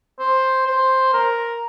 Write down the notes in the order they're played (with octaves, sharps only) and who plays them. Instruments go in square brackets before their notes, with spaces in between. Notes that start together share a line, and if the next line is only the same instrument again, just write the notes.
[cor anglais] C5
C5
A#4